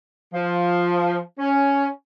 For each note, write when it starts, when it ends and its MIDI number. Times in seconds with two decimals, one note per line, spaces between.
0.34 1.18 53
1.39 1.87 61